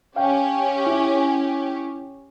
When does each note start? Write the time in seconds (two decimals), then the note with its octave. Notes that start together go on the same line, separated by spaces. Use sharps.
0.16 C#4 G4 F5 G5
0.87 E4